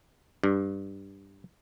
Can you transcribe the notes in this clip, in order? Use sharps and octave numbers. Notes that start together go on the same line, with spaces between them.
G2